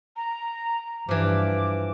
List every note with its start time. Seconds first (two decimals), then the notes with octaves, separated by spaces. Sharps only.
0.16 A#5
1.09 G2 E3 F3 D6